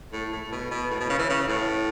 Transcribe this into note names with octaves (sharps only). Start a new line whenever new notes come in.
A2
A2
B2
B2
A2
B2
C#3
E3
C#3
A2